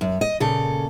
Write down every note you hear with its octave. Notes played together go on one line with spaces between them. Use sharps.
F#2
D#5
A#2 C#3 A4